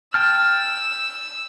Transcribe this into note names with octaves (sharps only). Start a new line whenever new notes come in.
G5 A5 E6 F6